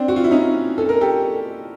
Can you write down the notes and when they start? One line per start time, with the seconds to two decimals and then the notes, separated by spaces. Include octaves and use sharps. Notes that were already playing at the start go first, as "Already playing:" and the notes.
Already playing: C4 D4
0.08 F#4
0.16 F4
0.24 E4
0.31 C#4 D#4
0.78 A4
0.89 A#4
1.01 G4 A4